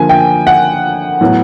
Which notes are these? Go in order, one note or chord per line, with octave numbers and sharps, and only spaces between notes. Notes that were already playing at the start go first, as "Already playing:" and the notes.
Already playing: D3 F3 A#3 G#5
G5
F#5
A2 F#3 B3